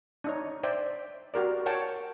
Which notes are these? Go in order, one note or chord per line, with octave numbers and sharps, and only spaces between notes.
D4 D#4 C#5
C5 D5 E5 G5
F#4 G4 A#4 D5
A#4 C#5 F#5 G5 A5